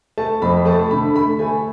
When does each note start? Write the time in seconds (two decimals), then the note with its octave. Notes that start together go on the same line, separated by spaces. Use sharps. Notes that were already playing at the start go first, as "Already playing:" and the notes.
0.18 A3 A5
0.42 F2 B5
0.65 A3 A5
0.91 D3 B5
1.15 A3 B5
1.39 A3 G#5